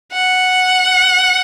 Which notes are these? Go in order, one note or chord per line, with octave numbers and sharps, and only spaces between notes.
F#5